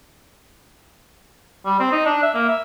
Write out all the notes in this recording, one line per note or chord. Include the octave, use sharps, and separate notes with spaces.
G3
C4
D#4
D4
E5
A#3
E5